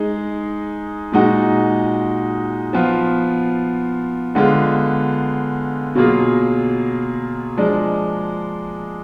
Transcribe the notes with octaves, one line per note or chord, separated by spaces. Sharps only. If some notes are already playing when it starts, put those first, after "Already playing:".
Already playing: G#3 D#4 G#4
A#2 G#3 D#4 F#4
F3 B3 F4
D3 G#3 B3 F4 G#4
B2 F#3 A#3 F4 G#4
F3 G#3 D4